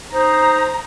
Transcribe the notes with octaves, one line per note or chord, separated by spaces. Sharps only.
D#4 C5 A#5